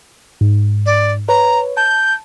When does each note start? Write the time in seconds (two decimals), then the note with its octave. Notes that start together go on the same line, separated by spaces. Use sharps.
0.41 G#2
0.86 D5
1.28 B4 C#5 A#5
1.77 A5 G6